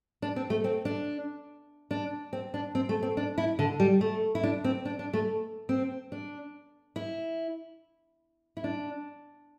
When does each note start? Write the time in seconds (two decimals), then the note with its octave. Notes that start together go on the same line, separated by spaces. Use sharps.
0.22 D4
0.36 C4
0.50 A3
0.64 C4
0.85 D4
1.91 D4
2.33 C4
2.54 D4
2.75 C4
2.89 A3
3.03 C4
3.17 D4
3.38 E4
3.59 D3
3.80 G3
4.01 A3
4.35 E4
4.43 D4
4.64 C4
4.85 D4
4.99 D4
5.13 A3
5.69 C4
6.12 D4
6.96 E4
8.57 E4
8.64 D4